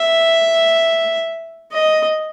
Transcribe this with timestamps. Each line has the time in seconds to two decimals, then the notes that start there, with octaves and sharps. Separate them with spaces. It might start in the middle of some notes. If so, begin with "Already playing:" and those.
Already playing: E5
1.72 D#5